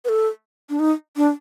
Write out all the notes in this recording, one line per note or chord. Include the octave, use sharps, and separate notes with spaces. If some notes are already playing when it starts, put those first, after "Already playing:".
B4
A4
D4
D#4
D4